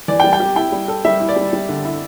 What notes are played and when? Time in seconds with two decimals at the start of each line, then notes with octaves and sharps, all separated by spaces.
0.08 E3 D5
0.20 G5
0.24 G3
0.33 G5
0.40 G4
0.56 E4 G5
0.72 G3
0.88 A4
1.05 G3 E5
1.20 E4
1.29 D5
1.36 G3
1.53 G3
1.69 D3
1.85 E4